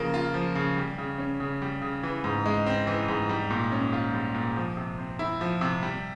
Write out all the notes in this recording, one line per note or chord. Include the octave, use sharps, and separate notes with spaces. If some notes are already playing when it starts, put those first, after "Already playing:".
Already playing: C#3 F3 A#3
F4
F3
C#3
G3
C#3
C#4
C#3
G3
C#3
E3
G#2
G#3
C4
E3
G#2
G3
A#2
C#4
F4
G3
A#2
F3
C3
C4
E4
F3
C3
G3